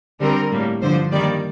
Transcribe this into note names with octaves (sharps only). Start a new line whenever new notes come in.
D3 G3 C4 A#4
A2 G3 A#3
G2 D3 F3 C5
D#3 G3 A#3 D5